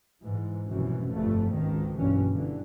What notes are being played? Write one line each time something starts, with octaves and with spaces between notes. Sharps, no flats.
G#2 E3
F1 F#2 B2 E3
G1 F2 A3
G#1 C#2 D#3
F#1 B1 G2 E3 C#4
G1 G2 D3 E3